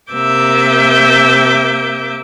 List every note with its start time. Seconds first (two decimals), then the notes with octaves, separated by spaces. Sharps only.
0.12 C3 A#3 E5 D6 G6